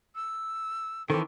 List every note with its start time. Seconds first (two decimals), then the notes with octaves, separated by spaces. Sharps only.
0.15 E6
1.10 D#3 E3 C4 A4